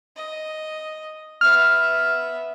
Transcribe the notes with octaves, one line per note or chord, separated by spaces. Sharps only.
D#5
B3 E5 F6